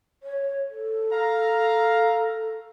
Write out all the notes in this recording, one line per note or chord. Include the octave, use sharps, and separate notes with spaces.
C#5
A4
F5 A#5